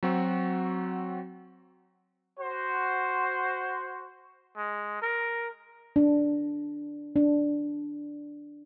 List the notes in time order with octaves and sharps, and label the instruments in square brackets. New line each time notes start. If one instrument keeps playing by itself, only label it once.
[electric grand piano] F#3 C4 F#4
[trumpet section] F#4 C5
[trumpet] G#3
A#4
[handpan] D4
D4